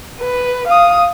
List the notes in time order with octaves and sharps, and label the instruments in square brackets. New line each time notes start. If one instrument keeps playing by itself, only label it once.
[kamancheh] B4
F5 D#6